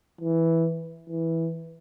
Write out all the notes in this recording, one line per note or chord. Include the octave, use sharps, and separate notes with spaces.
E3
E3